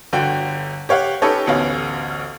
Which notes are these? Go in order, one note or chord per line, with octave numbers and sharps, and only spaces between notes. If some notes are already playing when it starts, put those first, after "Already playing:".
G1 D3 F#4 G5
G4 C#5 F5 F#5
C#4 D#4 G4 A4 B4 C#5
A1 D2 B3 C#4 F5